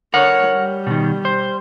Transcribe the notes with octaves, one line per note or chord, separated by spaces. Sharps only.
D3 A#4 C#5 F#5
G3
B2 D#3
C5